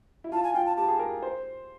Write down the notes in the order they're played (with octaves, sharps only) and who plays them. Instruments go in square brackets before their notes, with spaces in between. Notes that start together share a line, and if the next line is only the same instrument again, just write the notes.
[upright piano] E4
[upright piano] F4 [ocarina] A5
[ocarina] G#5
[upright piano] F4 [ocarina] G5
[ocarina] A5
[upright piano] G4 [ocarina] A5
[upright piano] G#4
A#4
C5